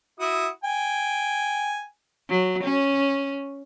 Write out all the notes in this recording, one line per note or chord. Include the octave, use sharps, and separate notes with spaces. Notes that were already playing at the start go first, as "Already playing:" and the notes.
E4 F#4 D#6
G5 G#5
F#3
C#4